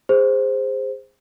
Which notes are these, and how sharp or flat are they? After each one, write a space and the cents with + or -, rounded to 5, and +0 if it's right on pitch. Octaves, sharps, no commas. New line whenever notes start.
G#4 -25 C5 +0